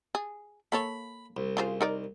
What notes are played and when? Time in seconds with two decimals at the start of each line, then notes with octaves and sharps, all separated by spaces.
0.15 G#4
0.72 A#3 A4 C#5 B5
1.37 C2
1.57 C#3 F4 C5
1.81 D#4 A#4 D5